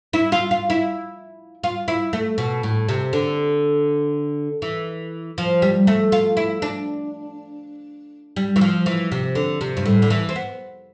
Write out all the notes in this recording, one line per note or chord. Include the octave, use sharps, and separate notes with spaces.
E4
F4
F4
E4
F4
E4
A3
B2
A2
C3
D3
E3
F3
G3
A3
F4
E4
D4
G3
E3
F3
E3
C3
D3
C3
G2
A2
D3
E3
C4
B3